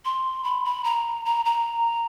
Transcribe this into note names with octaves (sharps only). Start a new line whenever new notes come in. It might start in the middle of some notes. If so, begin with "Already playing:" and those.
C6
B5
B5
A#5
A#5
A#5